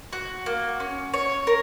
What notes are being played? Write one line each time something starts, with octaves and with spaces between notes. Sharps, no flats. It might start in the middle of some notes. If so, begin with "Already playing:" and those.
F#4
A#3
C#4
C#5
A#4